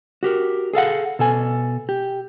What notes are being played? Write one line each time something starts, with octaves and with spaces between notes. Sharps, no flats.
F#4 G4 A#4
G#4 A4 F5 F#5
B2 A4 G#5
G4